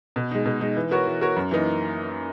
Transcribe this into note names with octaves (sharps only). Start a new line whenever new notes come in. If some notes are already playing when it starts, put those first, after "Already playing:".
B2
G#3 D#4
B2
G#3 D#4
E3
B3 F#4 A#4 C#5
E3
B3 F#4 A#4 C#5
F#2
E3 A#3 D#4